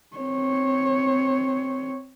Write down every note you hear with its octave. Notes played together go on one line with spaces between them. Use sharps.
C4 C#5